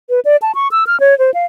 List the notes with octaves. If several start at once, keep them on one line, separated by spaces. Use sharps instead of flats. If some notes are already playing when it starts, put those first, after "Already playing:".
B4
D5
A5
C#6
E6
F6
C#5
C5
F5